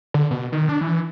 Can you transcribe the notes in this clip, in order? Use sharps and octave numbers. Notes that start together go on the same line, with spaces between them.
D3
B2
D#3
D4
E3